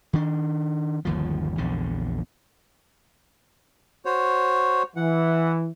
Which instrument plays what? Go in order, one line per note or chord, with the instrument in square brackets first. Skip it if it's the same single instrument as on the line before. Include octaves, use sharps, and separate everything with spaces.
[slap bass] D#3 D4
G1 D#2 F3
A#1 E2 D3
[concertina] F#4 C5 C#5
[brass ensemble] E3 [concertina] F#5